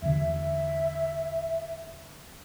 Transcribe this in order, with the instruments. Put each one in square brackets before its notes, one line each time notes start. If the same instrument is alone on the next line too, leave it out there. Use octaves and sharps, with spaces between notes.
[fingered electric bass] E2 D3 [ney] E5